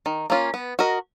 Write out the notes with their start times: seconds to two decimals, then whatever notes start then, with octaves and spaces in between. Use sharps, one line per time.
0.06 D#3
0.30 A#3 C#4 F4
0.54 B3
0.79 F#4 A#4 D#5